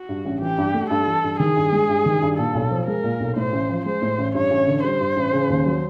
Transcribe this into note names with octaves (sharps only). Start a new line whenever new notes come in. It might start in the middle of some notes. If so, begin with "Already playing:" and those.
Already playing: F#4
G2
A1
E3 G4
G2
A3
G2 A4
E3
G2
D#3 G#4
G2
G#3
G2
D#3
G2
A#2 A4
B1
F3
G#3 A#4
A#2
B1
A2 C5
A1
F3
G#3 C5
A2
A1
G2 C#5
A1
D3
G3 C5
G2
A1
C#3
D#2
F#3